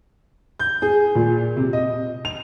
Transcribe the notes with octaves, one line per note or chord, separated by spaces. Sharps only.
G6
G#4
A#2
C3
D#5
F7